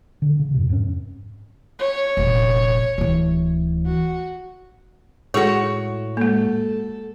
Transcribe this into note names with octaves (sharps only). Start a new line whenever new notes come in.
D3
C#3
F2 G#2 C3
F2 G#2 G#3 C#4
C#5
F1 A#1
D1 E3
F#4
A2 G#3 F#4 G#4 A4 C#5
G#3 A#3 A4